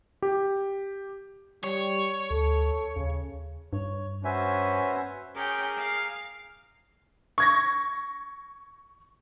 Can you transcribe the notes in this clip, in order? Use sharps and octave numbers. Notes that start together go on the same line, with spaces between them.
G4
G3 C#5
D2 A4
D#2 C#3
G2 C#5
C#4 F#4 B4 C5 E5 G#5
C#4 G#4 A#4 G5 D6
F5
C#6 G#6 A#6